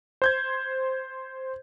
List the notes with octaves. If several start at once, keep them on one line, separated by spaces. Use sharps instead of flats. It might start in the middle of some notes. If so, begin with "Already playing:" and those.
C5 G6 G#6